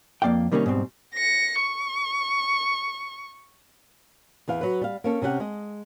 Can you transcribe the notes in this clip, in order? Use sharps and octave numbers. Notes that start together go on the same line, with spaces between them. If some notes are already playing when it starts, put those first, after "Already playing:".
F2 A#3 D5 F5 G5
C3 D#3 G3 A#3 C4 C#4
G#2 B2 G3 C4
A#6 C#7
C#6
E2 E3 F5
F#3 B4
G3 F5
A#3 C#4 A4
C3 C#4 G4 F#5
G#3 D#5